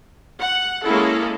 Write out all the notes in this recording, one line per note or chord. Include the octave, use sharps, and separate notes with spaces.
F#5
G#3 A#3 C#4 E4 G#4 A4